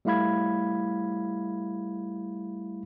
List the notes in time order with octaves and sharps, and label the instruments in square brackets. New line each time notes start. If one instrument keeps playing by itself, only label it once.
[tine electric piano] G3 A3 E4 F5 B5 G#6